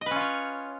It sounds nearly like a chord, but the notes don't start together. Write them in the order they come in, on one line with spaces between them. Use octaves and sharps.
D#5 B4 C#4 F4 C#5